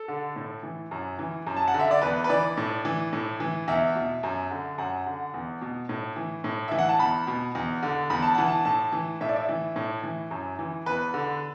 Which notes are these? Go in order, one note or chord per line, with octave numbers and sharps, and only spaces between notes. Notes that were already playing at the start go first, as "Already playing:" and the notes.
Already playing: A4
D3
A2
E3
F#2
E3
F#2
A5
F#5
D3
E5
D5
E2 B4
B4
E3 D5
A2
E3
A2
E3
E2 E5
B2
F#2
D3
F#2 F#5
D3
E2
B2
A2
E3
A2
E3 E5
F#5
A5
E2 B5
B2
E2
D3
E2 B5
A5
E3 F#5
A5
A2 A5
E3
A2 E5
D5
E5
E3
A2
E3
F#2
E3
E2 B4
D3